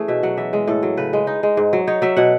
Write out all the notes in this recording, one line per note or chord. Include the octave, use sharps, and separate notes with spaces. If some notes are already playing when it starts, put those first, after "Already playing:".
Already playing: E3 A3 C#4 G#4
B2 E5
F#3 F#5
E3 E5
G#3
A2 A4
F#3
C#3 B4
G#3
D#4
G#3
G#2
F#3
D#4 C#5
F#3 E5
B2 F#5